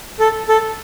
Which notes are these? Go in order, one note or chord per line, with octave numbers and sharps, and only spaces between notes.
A4
A4